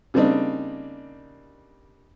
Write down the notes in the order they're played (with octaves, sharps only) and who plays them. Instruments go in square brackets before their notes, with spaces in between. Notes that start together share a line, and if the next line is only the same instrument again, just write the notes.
[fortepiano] C#3 G3 A#3 C4 D4 D#4